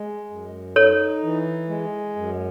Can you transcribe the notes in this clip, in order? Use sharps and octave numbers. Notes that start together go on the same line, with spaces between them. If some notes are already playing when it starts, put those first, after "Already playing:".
Already playing: G#3
F#2
D#4 A4 C#5
E3
G#3
F#2